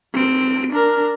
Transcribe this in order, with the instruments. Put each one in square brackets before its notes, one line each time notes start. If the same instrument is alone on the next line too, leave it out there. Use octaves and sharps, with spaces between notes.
[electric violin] C4 D7
D4 A#4